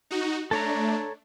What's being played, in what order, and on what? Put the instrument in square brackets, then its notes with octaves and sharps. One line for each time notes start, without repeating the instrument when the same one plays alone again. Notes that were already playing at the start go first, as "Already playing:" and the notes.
[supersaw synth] D#4 F#4
[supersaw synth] A3 D4 [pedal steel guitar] A4 C#5 A#5